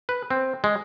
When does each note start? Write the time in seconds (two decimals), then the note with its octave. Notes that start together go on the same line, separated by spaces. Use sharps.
0.09 B4
0.31 C4
0.64 G#3